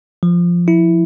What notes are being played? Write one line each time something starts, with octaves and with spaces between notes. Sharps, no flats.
F3
E4